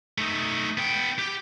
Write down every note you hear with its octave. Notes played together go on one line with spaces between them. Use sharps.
A3 D#4
B3 G5
G4